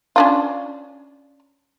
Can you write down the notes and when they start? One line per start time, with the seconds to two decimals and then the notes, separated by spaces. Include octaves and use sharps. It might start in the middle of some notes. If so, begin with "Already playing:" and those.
0.16 C#4 D4 F4